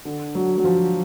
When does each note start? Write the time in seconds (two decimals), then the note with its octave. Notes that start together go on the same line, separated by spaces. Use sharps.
0.05 D3
0.35 F#3
0.58 F#3
0.64 F3